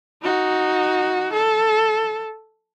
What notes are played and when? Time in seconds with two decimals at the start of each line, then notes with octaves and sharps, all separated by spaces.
0.22 D#4 F#4
1.33 A4